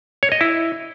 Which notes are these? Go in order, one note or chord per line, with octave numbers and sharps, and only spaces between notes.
C#5
D#5
E4